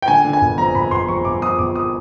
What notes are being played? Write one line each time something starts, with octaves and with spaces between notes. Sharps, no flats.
G5
D3 G#5
D3
G#5
G1
F2 A#5
G1 B5
G1 C6
F2 C#6
G1 D6
F2 D#6
G1 D6
D#6